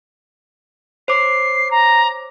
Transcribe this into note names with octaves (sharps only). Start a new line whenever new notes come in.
C5 C#5 D6 C7
A#5